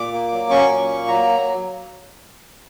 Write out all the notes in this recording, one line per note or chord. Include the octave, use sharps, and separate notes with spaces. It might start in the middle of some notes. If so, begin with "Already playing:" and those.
Already playing: A#2 D6
A#3
F#3
C#4 C#6
A#2
A#3
F#3 A#5